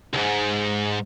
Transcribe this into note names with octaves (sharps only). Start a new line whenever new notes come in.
C#2 G#2